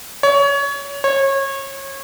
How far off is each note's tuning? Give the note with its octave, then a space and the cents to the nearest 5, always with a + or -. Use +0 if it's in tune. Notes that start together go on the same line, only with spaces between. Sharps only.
C#5 +25
C#5 -25